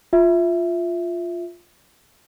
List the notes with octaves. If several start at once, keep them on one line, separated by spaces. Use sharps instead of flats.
F4 E5